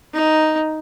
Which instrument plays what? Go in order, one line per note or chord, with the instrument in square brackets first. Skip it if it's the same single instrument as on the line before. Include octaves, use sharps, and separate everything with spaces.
[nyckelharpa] D#4